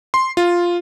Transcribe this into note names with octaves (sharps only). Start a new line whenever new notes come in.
C6
F4